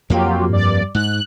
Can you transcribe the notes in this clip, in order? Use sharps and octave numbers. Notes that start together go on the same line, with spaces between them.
F2 F#3 A#3 F4 G4
G2 D5
G#2 F#6